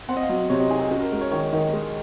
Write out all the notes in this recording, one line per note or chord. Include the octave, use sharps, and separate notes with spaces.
C4 F#5
D#5
F5
F#3
C3 C#5
D#5
D#4 G#4
G#4
C#4 F#4
A#4
G#3 A#4
C#5
D#3 C#5
D#3
G#3